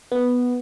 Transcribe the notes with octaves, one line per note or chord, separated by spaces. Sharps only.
B3